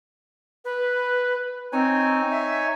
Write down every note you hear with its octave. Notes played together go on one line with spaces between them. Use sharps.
B4
C4 D#4 C#5 G#5
E5